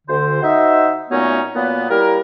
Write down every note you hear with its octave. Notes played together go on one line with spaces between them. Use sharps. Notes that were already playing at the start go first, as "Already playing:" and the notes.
D2 D3 C5
D#4 F#4 C5 D#5 E5
A#2 F#3 A3 B3 C#4 D#4
A#2 F#3 A#3 B3
G3 A#3 E4 A#4